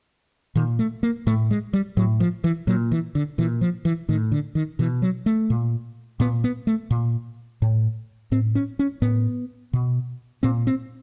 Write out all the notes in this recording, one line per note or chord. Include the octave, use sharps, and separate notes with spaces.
A#2 D#3
A3
A#3
A2 A3
G#3
G3
A2 F#3
F3
E3
A#2 F#3
E3
D3
A#2 E3
F3
E3
A2 D#3
D3
D#3
B2 E3
F#3
A3
A#2
A#2 B3
B3
A3
A#2
A2
A2 C4
C#4
C#4
A2 B3
B2
A#2 C4
C4